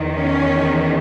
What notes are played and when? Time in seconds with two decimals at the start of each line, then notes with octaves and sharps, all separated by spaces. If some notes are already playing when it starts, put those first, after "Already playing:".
Already playing: E2 D#3
0.14 C#4